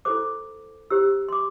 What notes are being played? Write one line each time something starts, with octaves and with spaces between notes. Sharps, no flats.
E4 A4 C5 D6
E4 G4 C5 E6
C6
D6